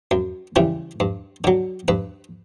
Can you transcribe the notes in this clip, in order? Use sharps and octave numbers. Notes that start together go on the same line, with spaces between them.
F#2
C#3 E3 G3
G2
D3 F#3
G2 B4